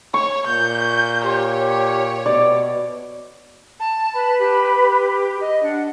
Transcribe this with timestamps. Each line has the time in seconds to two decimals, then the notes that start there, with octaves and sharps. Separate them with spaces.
0.14 C#5 C#6
0.47 A#2 G6
1.25 G4 C#5
2.26 B2 D5
3.80 A5
4.14 B4 B5
4.39 G4
5.41 D#5
5.63 D4 F#5